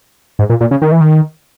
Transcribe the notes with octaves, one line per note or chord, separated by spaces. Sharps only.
G#2
A#2
A#2
C#3
D#3
E3
D#3